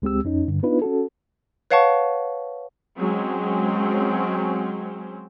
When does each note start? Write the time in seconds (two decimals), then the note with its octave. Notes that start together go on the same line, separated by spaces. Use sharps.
0.02 C#2 G#3 C4 G4 E6
0.25 F2 C#4 D#4
0.48 G2 D3
0.63 B3 D4 D#4 F4 B4
0.82 C#4 F#4 A4
1.71 B4 C#5 F5 F#5 A5 C#6
2.97 F#3 G#3 C4 C#4